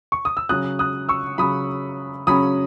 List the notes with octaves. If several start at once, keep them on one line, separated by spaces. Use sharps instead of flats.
C#6
D#6
E6
C#3 F#3 C#4 D#6 F#6
D#6 F#6
C#6 E6
C#3 F#3 C#4 B5 D#6
C#3 F#3 C#4 B5 D#6